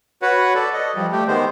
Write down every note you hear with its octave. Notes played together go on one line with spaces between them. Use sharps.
F#4 B4 C#5 F#5
A4 D5
D#5
F3 G3
A3 G4
D#3 G#3 B3 C5